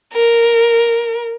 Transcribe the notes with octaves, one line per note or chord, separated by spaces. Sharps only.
A#4